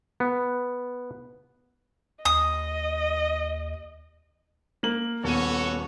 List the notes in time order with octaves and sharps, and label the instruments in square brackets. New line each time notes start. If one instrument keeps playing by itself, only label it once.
[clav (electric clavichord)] B3
[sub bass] D#2 [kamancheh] D#5 [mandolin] D#6
[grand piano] A#3 F#7
[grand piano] D#1 D#7 [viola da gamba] B3 [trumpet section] F#4 A4 C#5